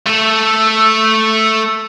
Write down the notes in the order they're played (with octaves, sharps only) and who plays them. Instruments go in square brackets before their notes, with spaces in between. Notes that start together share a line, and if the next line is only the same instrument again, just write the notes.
[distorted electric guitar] A3 A4